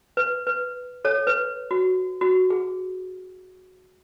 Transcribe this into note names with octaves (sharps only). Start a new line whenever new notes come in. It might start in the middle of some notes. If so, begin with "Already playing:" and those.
B4
B4
A4 C#5
B4
F#4
F#4
G#4